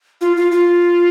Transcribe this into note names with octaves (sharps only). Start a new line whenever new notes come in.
F4
F4
F4